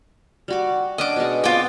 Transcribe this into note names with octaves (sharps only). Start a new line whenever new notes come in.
G3 F#4 D6
C#4 D4 D#5 D6
B2 G#3
B3 C4 F4 G5 D6